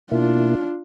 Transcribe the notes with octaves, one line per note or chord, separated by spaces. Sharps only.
B2 A#3 D4 E4 F4